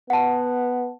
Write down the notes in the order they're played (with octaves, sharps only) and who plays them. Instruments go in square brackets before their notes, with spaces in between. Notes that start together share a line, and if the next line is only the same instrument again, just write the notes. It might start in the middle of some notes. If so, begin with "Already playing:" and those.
[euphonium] B3 [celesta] F#5 A5